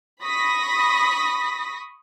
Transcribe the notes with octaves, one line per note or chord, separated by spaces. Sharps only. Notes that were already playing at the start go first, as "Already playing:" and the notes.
B5 C#6 D#6 A#6 B6